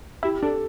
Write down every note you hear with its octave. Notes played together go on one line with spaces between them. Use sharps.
E4 G4
D4 A4